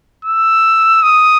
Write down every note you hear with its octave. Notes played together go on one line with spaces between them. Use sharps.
E6
D#6